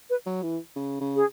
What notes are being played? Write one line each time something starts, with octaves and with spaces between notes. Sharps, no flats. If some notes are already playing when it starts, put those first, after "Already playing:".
B4
F#3
E3
C#3
C#3
G#4